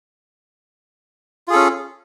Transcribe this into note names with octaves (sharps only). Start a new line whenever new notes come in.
C#4 F4 G#4 A4